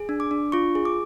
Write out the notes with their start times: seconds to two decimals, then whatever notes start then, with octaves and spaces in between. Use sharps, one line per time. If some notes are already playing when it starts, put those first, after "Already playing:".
Already playing: G#4
0.09 D4
0.20 D6
0.31 D4
0.52 F4 C#6
0.75 G#4
0.85 D6